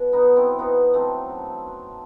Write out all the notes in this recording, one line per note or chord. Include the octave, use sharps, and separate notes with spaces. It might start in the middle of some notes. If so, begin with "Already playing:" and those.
Already playing: B2
B3 D#4
F#3
C4 E4
B2 B3 D#4
F#3 A3 C4
F#2
F#3